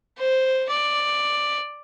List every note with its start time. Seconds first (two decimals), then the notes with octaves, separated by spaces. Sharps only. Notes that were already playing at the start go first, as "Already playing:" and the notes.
0.19 C5
0.69 D5